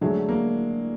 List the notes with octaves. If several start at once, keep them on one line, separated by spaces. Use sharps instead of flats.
D3 F#3 G#3 A3
A#3